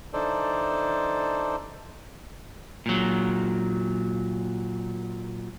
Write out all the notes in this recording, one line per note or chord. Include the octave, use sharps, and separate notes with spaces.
E3 D4 D#4 A4 C5 D5
A#2 F#3